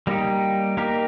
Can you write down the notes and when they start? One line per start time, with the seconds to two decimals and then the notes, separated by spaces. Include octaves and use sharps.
0.07 G3 A#3 D#4 G4
0.77 A#3 D#4 G4 A#4